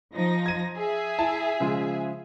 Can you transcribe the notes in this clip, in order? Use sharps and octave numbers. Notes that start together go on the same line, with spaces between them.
F3 D#4 A#6
G#6 D#7
G#4 E5
E4 A5
C#3 F3 G#3